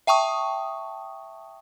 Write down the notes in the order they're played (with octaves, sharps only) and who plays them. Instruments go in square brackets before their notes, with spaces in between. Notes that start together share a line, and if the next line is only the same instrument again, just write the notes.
[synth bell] E5 G5 A5 C#6 D#6